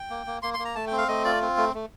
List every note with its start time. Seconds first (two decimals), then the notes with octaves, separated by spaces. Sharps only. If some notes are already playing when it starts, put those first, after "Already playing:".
Already playing: G5
0.10 A#3
0.27 A#3
0.42 A#3 C6
0.54 C6
0.59 A#3
0.65 A#5
0.75 A3 A5
0.87 G5
0.92 C4
0.98 F5
1.08 A3 D#5
1.25 F4 D5
1.41 C4
1.57 A3
1.74 A3